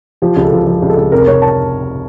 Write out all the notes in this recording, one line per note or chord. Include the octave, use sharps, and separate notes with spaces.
F3 G4
C#2 G4
A4
F3
F3
C#2 G4
A4
C#2
F1 A#4
F1 C#5
A5